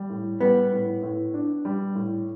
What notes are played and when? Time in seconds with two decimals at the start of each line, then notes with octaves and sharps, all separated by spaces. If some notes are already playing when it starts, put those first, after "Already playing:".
Already playing: G3
0.10 A2
0.40 G3 B3
0.72 A2
1.03 A2
1.34 D4
1.65 G3
1.95 A2